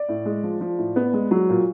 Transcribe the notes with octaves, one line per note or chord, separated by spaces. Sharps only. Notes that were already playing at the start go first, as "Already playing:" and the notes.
Already playing: D5
A2
G#3
F3
F3
A2
B3
G#3
F#3
A#2